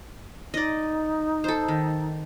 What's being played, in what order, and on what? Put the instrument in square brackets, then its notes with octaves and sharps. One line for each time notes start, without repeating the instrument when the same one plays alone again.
[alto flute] D#4 [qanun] D5 D#5
[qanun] A4 C5
D#3